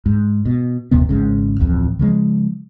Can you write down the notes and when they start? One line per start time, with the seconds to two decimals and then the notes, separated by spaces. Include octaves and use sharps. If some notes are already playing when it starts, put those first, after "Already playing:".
0.06 G#2
0.46 B2
0.91 F#1 D#2 C3 B3
1.09 G#1 G#2 C#3
1.60 D1 A1 F2
1.99 C#3 F3 G#3